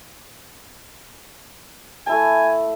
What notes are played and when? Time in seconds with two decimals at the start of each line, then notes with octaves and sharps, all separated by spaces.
2.07 A3 E4 G#5 A5